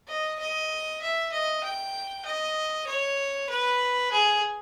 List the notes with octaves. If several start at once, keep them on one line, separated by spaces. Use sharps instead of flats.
D#5
D#5
E5
D#5
G5
D#5
C#5
B4
G#4